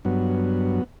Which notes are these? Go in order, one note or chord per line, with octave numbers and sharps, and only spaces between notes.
G2 F#3 B3